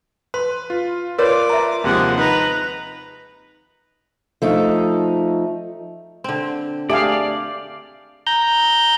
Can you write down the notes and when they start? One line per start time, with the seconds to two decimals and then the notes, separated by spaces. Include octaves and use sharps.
0.34 B4 C6
0.70 F4
1.18 F4 A#4 B4 C#5 D5 D6
1.50 E5 A#5
1.84 D#2 C3 F3 G#3 F#5
2.18 D#4 B4 A#5
4.42 F3 A3 D#4
6.24 D3 C4
6.90 A3 G4 G#4 D5 F5
8.27 A#5 G6